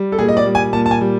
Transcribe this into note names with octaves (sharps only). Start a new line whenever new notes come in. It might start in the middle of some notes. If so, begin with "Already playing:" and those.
Already playing: G3
A4
A#2 G#4
D#5
D5
G3
G#5
A#2 A5
A5
G#5
G3